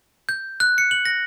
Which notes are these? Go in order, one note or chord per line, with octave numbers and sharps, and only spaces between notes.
G6
F#6
C#7
F#7
A#6